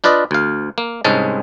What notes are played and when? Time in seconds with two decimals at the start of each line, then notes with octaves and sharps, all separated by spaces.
0.04 D4 F4 B4 D5 D#5
0.31 D2 F5
0.78 A#3
1.04 C2 G#2 G#3 C#4 A5